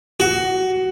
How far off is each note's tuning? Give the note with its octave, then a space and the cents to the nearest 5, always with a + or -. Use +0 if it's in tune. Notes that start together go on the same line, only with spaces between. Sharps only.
F#4 +15